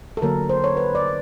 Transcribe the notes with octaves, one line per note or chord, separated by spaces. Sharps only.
A4
D3 F#3 A#3 A#4
C5
C#5
B4
D5